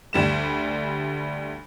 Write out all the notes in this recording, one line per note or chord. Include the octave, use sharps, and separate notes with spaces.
D2 G3 E7